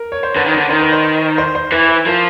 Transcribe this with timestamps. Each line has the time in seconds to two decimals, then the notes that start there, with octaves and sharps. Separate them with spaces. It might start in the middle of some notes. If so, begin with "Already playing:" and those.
Already playing: A#4
0.12 C#5
0.23 C5
0.35 D3 B4
0.45 D#3
0.52 D3 C5
0.69 D#3 C5
0.81 B4
0.93 C5
1.38 C5
1.55 C5
1.72 E3 B4
1.89 B4
2.06 F3 A#4